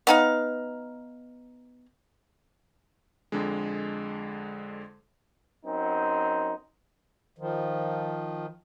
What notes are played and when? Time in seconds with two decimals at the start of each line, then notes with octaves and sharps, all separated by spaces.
0.07 B3 D#4 F5
3.32 F2 D3 G#3
5.65 F#2 C4 D#4
7.38 D#3 F3